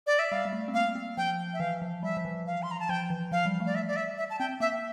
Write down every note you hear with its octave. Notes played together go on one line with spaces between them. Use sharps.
D5
E5
G3 F5
G3
A3
C4
A#3 F5
C4
F3 G5
E5
E3 F5
F3
G3 E5
F3
E3
F5
C6
A#5
A5
F3 G5
E3
F3 F5
G3
A3
D5
E5
D5
E5
E5
A5
C4 G5
A#3 E5